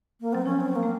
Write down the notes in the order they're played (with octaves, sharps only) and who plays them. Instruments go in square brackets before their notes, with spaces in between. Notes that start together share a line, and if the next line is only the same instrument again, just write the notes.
[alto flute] A#3
[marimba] F#3 [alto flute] C4
[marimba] F3 [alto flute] C#4
[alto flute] C4
A#3
[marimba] A3